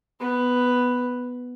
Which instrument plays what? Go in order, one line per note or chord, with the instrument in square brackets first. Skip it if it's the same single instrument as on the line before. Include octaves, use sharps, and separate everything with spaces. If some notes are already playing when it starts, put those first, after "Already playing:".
[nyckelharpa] B3 B4